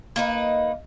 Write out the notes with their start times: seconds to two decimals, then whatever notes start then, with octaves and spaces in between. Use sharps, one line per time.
0.16 A#3 D#4 B4